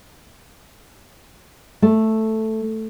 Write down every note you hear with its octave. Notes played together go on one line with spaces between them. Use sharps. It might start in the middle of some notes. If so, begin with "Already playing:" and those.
A3